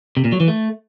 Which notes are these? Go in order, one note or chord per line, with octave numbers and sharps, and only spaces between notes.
C3
A#2
F#3
E3
A3